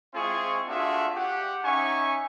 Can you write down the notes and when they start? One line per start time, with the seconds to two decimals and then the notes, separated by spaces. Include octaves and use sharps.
0.14 G#3 C4 E4 F4 G#4 C#6
0.68 A3 D4 F4 F#4 G#4 E5
1.16 G4 F#5
1.65 C#4 D#4 E5 G#5 C#6